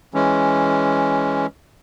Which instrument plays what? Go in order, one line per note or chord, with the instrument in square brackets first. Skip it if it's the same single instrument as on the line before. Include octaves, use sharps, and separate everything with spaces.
[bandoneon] E3 G#3 C#4